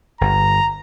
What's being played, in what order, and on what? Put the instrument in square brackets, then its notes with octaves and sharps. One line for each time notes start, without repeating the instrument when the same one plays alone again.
[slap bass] G1 [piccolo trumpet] A#5